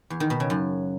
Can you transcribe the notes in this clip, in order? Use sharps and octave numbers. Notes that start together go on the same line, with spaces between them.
E2
D#3
B2
C#3
F#2